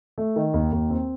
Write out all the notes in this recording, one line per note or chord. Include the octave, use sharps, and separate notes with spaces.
A3
D#3
D#2
D#2
C4